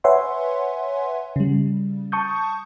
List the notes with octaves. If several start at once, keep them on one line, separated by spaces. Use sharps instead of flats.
B4 C#5 E5 F#5 G#5 C6
C#3 G3
A5 C#6 D#6 G6